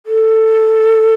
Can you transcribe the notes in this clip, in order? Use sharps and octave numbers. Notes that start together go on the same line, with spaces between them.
A4